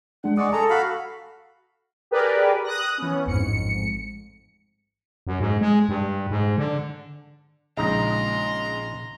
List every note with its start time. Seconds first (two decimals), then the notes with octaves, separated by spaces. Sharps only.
0.24 G#3 D4 F#5
0.37 G#3 D5 F#5 C#6 D#6
0.53 G#4 A4 A5 A#5 D#6
0.70 F#4 F5 B5
2.11 G4 G#4 A#4 B4 D5
2.64 D#6 F#6 A#6
2.98 E3 B3 C#4
3.26 A1 F2 G#2 C#7
5.27 F#2
5.40 G#2
5.61 G#3
5.89 G2
6.30 G#2
6.58 D3
7.77 A#1 C#3 G#3 D#4 D#5 A#5 C6